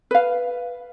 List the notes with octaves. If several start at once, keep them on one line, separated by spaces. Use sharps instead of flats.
B4 F5